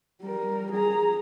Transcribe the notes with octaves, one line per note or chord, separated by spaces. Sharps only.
G3 A#4
G#4 A#5